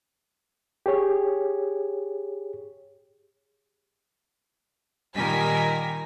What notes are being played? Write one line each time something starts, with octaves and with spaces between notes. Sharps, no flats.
G4 G#4 C#5
A#2 D#3 G3 A#4 G#5 B6